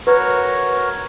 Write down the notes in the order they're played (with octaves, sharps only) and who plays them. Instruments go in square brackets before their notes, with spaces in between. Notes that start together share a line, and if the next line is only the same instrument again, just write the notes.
[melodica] F#4 A#4 C#5 [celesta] B4